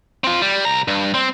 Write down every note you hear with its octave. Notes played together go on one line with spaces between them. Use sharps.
C4 F4
G3
C2 A#5
G2
C4